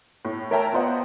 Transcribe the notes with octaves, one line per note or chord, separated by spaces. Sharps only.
A2
A#4 C#5 E5 G5 A5 A#5
B3 F4 C5 D#5 F#5